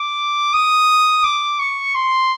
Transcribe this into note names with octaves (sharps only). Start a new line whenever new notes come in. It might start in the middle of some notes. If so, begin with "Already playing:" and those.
Already playing: D6
D#6
D6
C#6
C6